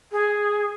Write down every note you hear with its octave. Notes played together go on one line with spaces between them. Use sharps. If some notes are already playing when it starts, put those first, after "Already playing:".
G#4